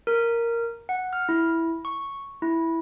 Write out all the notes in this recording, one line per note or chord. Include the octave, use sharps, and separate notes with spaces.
A#4
F#5
F6
E4
C#6
E4